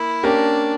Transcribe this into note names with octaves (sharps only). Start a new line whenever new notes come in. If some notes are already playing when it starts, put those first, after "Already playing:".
Already playing: A#3 E4
A#3 C#4 D4 G4 A#4